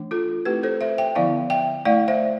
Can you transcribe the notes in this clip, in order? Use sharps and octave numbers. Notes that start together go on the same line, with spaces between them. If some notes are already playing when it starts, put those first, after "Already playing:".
Already playing: E3 A3 D4
F4 A4
A3 C4 E4 G4 B4
A4 C5
C5 E5
E5 G5
D3 F3 B3 E4 D5 F5
E5 G5
A3 E4 D5 F5
C5 E5